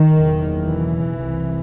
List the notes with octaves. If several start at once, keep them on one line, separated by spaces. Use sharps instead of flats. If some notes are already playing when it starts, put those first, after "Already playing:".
Already playing: D#3
F#1 E2 B2
E3
C2 C3